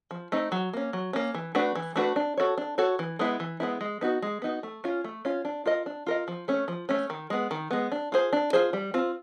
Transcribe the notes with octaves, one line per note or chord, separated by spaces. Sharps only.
F3
A3 C4 D#4
F#3
A#3 C#4
F#3
A#3 C#4
E3
A3 D4 F#4 B4
E3
A3 D4 F#4 B4
D4
F#4 A4 C#5
D4
F#4 A4 C#5
E3
G#3 B3 E4
E3
G#3 B3 E4
G#3
B3 D#4 F#4
G#3
B3 D#4 F#4
A3
C#4 F4
A3
C#4 F4
D4
F4 A#4 D#5
D4
F4 A#4 D#5
F3
A3 C#4
F3
A3 C#4
D#3
G#3 B3
D#3
G#3 B3
D4
F4 G#4 C5
D4
F4 G#4 C5
G3
C4 F4